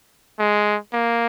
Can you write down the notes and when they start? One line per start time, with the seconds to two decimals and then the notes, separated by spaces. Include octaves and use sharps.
0.39 G#3
0.93 A#3